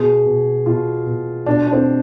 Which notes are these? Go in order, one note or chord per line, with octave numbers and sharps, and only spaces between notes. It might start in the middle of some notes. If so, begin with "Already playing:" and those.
Already playing: B2 G#4
B2
B2 F4
B2
B2 D4
D4
C4